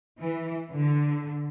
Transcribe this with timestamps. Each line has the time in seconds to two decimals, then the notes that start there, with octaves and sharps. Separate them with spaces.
0.19 E3
0.71 D3